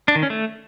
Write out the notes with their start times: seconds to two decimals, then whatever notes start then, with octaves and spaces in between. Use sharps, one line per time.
0.08 D4
0.15 D#3
0.23 C#4
0.30 A3